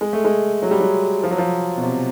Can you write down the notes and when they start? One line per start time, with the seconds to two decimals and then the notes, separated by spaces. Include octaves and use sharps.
0.01 G#3
0.13 A3
0.25 G#3
0.62 F#3
0.71 G3
0.80 F#3
1.23 F3
1.31 F#3
1.38 F3
1.78 B2
1.83 C3